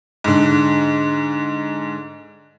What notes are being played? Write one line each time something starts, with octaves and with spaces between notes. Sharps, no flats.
G#2 D3